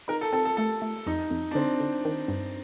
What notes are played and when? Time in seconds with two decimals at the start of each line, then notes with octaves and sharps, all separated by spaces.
0.08 D#4 A#4
0.21 A4
0.33 C4 A4
0.45 A4
0.57 A3 A4
0.82 A3
1.06 F2 D#4
1.30 F2
1.51 D4
1.55 D3 C4
1.80 D3
2.05 D#3
2.28 G2